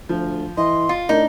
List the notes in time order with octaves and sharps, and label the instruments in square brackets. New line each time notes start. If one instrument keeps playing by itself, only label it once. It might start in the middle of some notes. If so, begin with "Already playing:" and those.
[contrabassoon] D2 [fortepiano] F3
[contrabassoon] E3 [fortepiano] D#5 [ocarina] C6
[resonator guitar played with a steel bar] F4
[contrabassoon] A2 [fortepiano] D4 [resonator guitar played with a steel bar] D#4 [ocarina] A#4